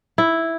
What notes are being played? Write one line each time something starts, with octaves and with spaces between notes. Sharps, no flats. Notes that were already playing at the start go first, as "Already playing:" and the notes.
E4